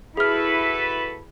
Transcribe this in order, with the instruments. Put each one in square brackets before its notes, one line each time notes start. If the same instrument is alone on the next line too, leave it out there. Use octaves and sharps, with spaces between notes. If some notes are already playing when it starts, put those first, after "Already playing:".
[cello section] E4 [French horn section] F#4 A4 B4 [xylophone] G#4 F6 [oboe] B5